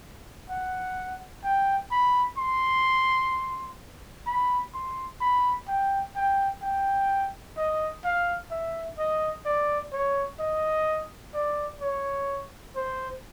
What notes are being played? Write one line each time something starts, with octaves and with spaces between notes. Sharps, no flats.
F#5
G5
B5
C6
B5
C6
B5
G5
G5
G5
D#5
F5
E5
D#5
D5
C#5
D#5
D5
C#5
C5